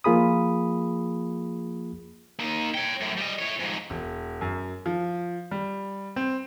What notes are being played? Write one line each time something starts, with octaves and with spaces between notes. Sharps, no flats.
F3 A#3 F4 G#4 B5 D#6
A#3 D#4
C#5 G5
F#2 A2
G3 D#5
E4 C#5
F2 G#2
E1
F#2
F3
G3
C4